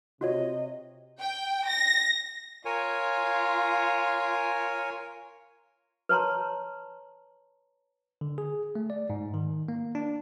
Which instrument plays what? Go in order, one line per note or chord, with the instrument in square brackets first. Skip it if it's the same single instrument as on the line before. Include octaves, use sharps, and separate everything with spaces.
[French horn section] C3 [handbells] F4 F#4 C#5 [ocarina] D#5
[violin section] G5
A#6
[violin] F4 [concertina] A#4 C#5 G#5
[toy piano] B4 C#5 A5 A#5 C6
[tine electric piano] D3
G#4
A3
D5
G#2
D#3
A#3
D4